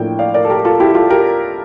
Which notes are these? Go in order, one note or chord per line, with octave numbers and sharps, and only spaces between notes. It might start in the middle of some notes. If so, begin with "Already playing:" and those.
Already playing: A2 F3 A#3 D4 G5
D5 F5
A#4 D5
A4
G4 A#4
F4 A4
E4 G4
F4 A4
G4 A#4